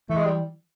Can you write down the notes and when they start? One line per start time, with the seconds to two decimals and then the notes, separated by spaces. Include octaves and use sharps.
0.09 E3 A3
0.17 G#3
0.25 G3